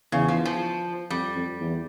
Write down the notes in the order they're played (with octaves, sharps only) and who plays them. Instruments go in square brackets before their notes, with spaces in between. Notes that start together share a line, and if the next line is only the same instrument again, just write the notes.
[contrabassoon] E2 [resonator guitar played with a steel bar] C#3
[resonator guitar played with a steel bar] F3
F3
[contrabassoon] F2 [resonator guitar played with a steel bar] G3
[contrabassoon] F2
E2